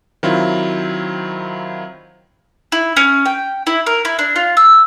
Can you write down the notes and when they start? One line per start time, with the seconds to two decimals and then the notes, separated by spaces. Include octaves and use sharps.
0.23 D#3 F#3 C4 E4 F4
2.72 E4
2.97 C#4
3.26 G5
3.67 E4
3.86 A#4
4.05 E4
4.19 D4
4.36 F4
4.57 E6